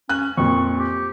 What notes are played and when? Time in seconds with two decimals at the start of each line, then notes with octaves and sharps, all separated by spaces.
0.09 C#4 F#6
0.38 F2 A#2 C#6
0.78 G4